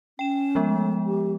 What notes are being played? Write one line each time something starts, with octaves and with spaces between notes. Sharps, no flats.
C#4 G5 E7
F3 G#3 B3
A3
G4